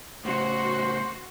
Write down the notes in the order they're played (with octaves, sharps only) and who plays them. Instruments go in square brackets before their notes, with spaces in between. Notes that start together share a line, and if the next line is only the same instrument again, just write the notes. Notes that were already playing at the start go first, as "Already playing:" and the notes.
[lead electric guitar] A2 C#3 [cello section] F#4 [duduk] C5